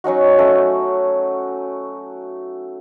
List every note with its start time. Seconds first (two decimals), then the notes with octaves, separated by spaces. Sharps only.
0.04 F#3 C#4 D#4 F#4
0.38 A3 C#4